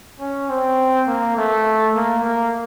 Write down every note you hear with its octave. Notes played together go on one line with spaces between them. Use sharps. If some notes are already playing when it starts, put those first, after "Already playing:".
C#4
C4
A#3
A3
A#3
A#3